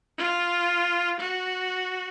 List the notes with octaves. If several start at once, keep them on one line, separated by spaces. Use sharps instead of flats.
F4
F#4